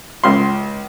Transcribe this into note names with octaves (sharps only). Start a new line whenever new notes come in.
C#2 C6